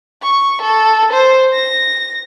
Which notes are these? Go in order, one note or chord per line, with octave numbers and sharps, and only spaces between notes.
C#6
A4
C5
A#6